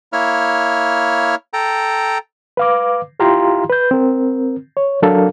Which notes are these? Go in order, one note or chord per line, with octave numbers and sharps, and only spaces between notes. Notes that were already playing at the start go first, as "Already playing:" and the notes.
A#3 E4 C#5 F6
A4 G5 A#5
B4 F5 D6
E4 F4 G4 F5 A#5 C6
B4 G6
C4 A#4
C#5
F#3 D4 A4 A#4 F5